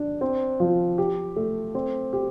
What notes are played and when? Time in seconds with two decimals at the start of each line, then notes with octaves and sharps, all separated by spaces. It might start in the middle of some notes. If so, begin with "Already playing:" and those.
Already playing: D4
0.21 C4
0.60 F3
0.98 G4
1.36 A3
1.75 C4
2.13 G4